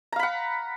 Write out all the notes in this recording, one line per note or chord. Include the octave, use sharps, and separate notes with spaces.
F5 F#5 A#5 B5